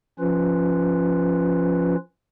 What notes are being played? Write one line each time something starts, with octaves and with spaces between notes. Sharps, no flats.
F3 C#4 F4 B4